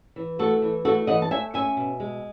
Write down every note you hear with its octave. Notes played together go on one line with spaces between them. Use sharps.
E3
A3 F#4 A4
E3
A3 F#4 A4
E3 D#5 F#5
A5
A3 E5 G#5
C#4 E5 G#5
B2
G#3